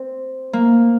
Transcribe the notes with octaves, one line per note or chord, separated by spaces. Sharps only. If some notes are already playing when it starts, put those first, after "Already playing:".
Already playing: C4
A#3